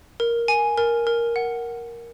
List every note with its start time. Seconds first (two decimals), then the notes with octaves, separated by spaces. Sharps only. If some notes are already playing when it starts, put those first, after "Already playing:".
0.20 A#4
0.48 G#5
0.77 A#4
1.07 A#4
1.36 F#5